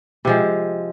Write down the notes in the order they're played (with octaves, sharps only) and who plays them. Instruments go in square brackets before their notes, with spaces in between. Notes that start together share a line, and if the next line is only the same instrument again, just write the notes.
[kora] C3 F3 G#3